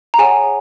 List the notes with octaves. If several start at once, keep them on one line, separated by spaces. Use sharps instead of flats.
A#5
G#4 C#5 F#5 G#5